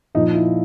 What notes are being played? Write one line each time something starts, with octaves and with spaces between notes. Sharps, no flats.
A#2 F3 D#4
E4